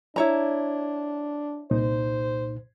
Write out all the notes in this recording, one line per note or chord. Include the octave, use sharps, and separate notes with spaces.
D4 E4 C#5 A#5
C2 A#2 D#4 C5